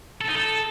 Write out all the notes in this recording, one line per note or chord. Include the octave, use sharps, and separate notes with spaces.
A4
D#4
A4